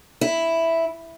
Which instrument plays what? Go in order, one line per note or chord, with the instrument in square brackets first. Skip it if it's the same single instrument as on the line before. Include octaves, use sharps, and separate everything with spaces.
[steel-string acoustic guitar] E4